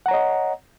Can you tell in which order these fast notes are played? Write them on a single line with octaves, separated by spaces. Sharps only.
F#5 A#5 C#5 D#5